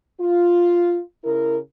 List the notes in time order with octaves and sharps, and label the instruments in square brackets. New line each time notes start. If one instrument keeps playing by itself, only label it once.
[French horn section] F4
C#3 E4 A#4